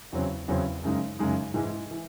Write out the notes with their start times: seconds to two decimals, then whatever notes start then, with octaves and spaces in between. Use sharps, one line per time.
0.13 E2 C#3 F#3 C4
0.48 E2 C#3 F#3 C4
0.83 F#2 C#3 G#3 D#4
1.19 F#2 C#3 G#3 D#4
1.54 G#2 E3 G#3
1.91 E3